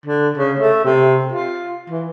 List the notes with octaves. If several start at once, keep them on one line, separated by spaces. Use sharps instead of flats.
D3
C#3
A3
C3
F4
E3